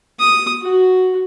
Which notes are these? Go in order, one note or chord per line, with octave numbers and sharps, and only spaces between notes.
D#6
F#4